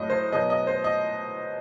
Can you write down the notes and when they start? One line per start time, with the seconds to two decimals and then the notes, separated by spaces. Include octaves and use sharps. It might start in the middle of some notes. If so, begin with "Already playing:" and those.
Already playing: A2 F#3 D#5
0.10 C5
0.32 B2 F#3 D#5
0.50 D#5
0.67 C5
0.84 D#5